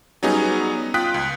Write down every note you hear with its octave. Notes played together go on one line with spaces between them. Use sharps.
F#3 G3 B3 C#4 D#4 G#4
F4 G5 D#6 F#6 B6
C#2